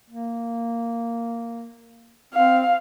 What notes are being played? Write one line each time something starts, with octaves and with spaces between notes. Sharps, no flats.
A#3
C4 F5